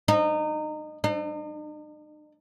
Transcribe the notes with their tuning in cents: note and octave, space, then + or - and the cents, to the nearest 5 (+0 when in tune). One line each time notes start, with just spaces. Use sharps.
D#4 -25
D#4 -45